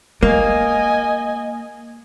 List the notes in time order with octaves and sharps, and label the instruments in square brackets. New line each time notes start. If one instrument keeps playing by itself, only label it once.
[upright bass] G#3 [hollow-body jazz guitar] A#3 [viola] D#5 G#5